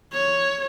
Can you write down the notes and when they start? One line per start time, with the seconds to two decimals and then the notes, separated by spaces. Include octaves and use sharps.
0.13 C#5